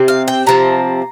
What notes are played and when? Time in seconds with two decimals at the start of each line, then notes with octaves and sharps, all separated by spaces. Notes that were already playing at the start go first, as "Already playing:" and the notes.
Already playing: C3 C4
0.08 F5
0.28 G5
0.47 C3 F3 C4 A#5